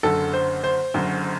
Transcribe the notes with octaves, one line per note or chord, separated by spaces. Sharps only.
F#1 F#2 D3 A4
C5
C5
F#1 F#2 D3